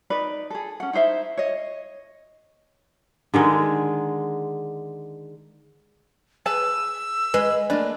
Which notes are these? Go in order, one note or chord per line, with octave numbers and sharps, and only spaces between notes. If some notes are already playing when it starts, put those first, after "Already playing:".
D#4 B4 D5
G#4 A4
C#4 F#5
D#4 E4 C5 E5
C#5 D#5
D3 D#3 G#3
G#4 B4 A5 E6
G#3 B4
A3 A#3 D4 B4